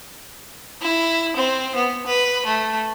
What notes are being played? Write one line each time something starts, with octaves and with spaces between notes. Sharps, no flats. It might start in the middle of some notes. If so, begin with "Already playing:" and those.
E4
C4
B3
B4
A3